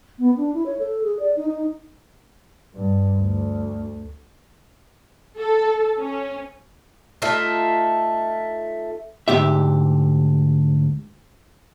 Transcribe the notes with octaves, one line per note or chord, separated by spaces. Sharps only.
B3
D4
E4
C#5
A4
G#4
D5
D#4
D#4
G2
D2
A4
C#4
A3 D#4 F4 E5
D2 G#2 G4 E5